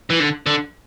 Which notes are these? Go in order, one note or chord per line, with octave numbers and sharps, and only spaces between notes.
E3
D3
D3